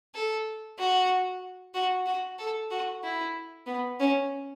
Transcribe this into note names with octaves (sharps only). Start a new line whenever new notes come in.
A4
F#4
F#4
F#4
A4
F#4
E4
B3
C#4